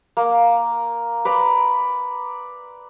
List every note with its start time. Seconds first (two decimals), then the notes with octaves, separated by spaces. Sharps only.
0.17 A#3
1.25 B4 D5 A#5 C6